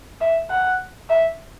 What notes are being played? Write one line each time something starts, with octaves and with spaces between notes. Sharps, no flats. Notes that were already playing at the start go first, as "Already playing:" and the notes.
E5
F#5
E5